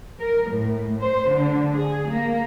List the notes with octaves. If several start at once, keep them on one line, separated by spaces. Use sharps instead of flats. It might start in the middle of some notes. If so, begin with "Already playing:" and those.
A#4
A2
C5
D3
G#4
A#3